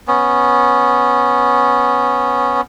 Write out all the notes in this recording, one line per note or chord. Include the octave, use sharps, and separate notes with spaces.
B3 C#4